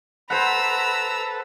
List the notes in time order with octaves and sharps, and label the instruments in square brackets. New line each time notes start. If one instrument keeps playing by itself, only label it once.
[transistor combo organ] A4 B4 [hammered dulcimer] C5 F#5 [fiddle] A#5 E6 [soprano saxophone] B5